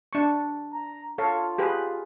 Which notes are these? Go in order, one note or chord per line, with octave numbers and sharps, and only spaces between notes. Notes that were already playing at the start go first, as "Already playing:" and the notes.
D4 C#6
A#5
F4 A4 C#5 F5
G4 G#4 B4